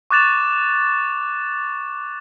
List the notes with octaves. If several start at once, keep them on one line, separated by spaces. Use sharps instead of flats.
C#6 D6 F#6 A6 E7 F7